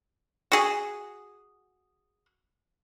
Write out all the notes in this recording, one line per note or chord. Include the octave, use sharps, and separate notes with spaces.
F#4 G#4